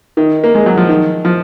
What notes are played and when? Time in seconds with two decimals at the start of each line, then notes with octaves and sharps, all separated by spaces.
0.17 D#3
0.44 A#3
0.55 G#3
0.66 F#3
0.77 F3
0.89 D#3
1.25 F3